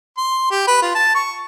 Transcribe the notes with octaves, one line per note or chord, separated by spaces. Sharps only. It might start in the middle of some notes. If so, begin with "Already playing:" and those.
C6
G4
B4
F4
A5
C#6